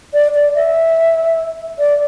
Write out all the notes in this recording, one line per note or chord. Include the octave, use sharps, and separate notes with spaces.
D5
D5
E5
D5